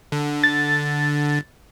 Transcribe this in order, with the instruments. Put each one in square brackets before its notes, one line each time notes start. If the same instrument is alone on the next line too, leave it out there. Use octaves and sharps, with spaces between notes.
[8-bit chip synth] D3
[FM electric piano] A6